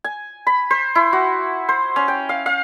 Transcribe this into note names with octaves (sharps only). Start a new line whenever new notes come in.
G#5
B5
C5
E4
F#4
C5
C#4
G5
F5
F5